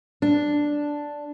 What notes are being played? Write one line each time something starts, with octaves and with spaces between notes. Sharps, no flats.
D4